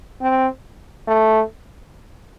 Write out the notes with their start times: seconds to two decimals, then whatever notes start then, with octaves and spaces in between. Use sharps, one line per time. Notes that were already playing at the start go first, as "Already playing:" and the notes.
0.21 C4
1.08 A3